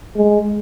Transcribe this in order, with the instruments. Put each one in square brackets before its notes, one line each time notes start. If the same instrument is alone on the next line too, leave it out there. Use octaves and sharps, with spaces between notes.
[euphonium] G#3